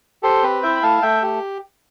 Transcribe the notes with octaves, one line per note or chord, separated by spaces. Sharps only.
G4 A4 C5
C4 B4
E4 E5 G5
B5
A3 F5 A5
A3 E5 G5
G4